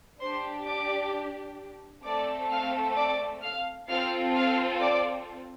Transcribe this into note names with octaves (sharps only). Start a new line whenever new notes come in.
D4 G4 C5 C6
D5 D6
A3 C4 A4 D5 D6
F5 F6
D5 D6
F5 F6
C4 F4 A4 F5 F6
F5 F6
D5 D6